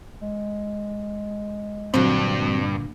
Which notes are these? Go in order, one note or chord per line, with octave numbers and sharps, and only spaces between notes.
G#3
G2 A#2 D3 F#3 C4